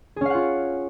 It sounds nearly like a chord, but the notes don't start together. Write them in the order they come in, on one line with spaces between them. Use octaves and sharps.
G#4 C#4 F5 F#5 F4